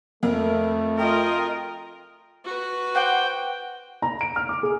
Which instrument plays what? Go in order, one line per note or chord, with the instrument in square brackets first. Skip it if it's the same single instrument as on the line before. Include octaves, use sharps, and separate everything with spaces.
[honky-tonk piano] F2 [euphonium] A3 [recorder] A#4
[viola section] F4 A#4 D#5 [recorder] G5
[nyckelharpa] F#4 B4
[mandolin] C5 F#5 D6 [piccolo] G5
[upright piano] A#5
D7
F6
D6
G#4